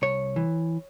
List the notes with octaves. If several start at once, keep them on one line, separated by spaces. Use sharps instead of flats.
C2 C#5
E3